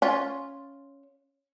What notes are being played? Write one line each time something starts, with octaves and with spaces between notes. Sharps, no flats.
C#4 F4